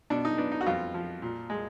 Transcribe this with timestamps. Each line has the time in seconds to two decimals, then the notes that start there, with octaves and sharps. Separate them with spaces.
0.10 B2 D4
0.25 D#4
0.38 B3 D4
0.52 D#4
0.61 F#4
0.66 F2 F4
0.94 F3
1.22 A#2
1.50 G#3